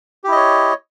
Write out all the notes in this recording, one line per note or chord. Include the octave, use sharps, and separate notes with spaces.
E4 G4 C#5 D#5